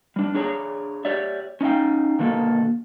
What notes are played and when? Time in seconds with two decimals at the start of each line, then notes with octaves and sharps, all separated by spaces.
0.16 G3 D4
0.34 D4 G#4 C#5 A#5
1.05 G4 C#5 D5 E5
1.61 C#4 D#4 D#5 F5 G5
2.19 B2 D3 D#3 A#3 F#4 A4